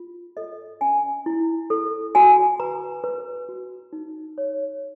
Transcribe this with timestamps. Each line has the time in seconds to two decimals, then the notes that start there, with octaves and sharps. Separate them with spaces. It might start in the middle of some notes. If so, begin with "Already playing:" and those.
Already playing: F4
0.37 A4 D#5
0.81 C#4 G#5
1.26 E4
1.70 A4
2.15 F#4 G#5
2.60 B4 A#5
3.04 B4
3.49 F#4
3.93 D#4
4.38 C#5